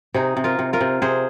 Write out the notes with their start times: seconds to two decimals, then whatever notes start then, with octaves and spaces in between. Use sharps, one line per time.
0.14 C3 D#4 G#4
0.37 C3
0.44 F4 A#4
0.59 C3
0.73 F4 A#4
0.81 C3
1.02 C3 G#4 C5